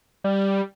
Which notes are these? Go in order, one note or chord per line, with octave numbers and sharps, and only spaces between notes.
G3